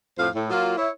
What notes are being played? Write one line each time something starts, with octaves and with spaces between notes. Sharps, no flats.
F2 A2 C5 F5
A2
F#3 A#3 F4
E4 C#5